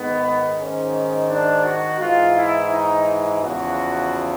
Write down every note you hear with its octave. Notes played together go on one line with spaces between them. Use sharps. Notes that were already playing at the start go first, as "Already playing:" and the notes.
Already playing: G#2 D#3 B3
G#2 D#3 C#4
D4
F#4
G#2 E3 F4
E4
D#4
E2 C#3 F3 F#4